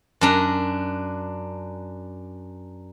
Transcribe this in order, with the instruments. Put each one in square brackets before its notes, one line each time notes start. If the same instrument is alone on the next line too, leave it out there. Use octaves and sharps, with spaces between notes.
[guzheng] F#2 D4 A#5